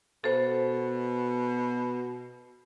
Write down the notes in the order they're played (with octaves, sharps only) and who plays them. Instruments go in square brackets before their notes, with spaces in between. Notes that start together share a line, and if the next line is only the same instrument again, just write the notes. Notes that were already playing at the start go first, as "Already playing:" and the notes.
[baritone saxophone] B2 [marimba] A4 C5